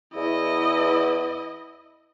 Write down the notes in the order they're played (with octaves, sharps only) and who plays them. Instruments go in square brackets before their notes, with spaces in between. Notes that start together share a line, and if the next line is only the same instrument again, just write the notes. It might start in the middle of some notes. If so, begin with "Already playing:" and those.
[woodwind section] E2 [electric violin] E4 D#5